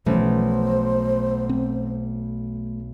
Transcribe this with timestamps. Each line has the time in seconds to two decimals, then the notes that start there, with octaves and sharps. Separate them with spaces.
0.06 B1 E3 F3 A3 C#4 C5
1.49 C4